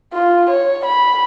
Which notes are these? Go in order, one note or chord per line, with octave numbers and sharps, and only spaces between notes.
F4
C#5
B5